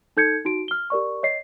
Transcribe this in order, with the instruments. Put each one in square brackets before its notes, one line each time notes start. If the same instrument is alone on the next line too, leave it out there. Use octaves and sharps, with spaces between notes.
[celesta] D#4 A4 G6 G#6 C#7
D#4 F#4 D7
F6 G7
G4 A#4 D5 C#6
C#5 D#5 C7